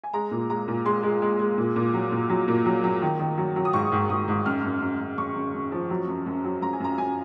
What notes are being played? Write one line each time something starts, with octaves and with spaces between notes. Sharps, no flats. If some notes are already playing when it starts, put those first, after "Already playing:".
G#5
G#3 A#5
A#2
G#3 A#5
A#2
G#3 C6
G#3
G#3
G#3
A#2
A#2
F#3
A#2
F#3
A#2
F#3
F#3
D#3
D#3
F#3
F#3
D#6
G#2 C#6
G#2
G#2 D#6
G#2
F#2 F6
F#2
F#2
F#2
F#2 C#6
F#2
F#2
F3
F#3
F#2
F#2
F#3
F#2 A#5
G#5
F#2 A#5
F#2 G#5